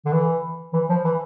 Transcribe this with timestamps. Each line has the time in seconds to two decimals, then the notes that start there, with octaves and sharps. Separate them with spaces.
0.05 D3
0.12 E3
0.73 E3
0.89 F3
1.04 E3